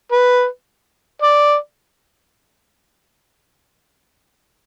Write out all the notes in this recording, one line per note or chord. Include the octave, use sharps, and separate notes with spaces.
B4
D5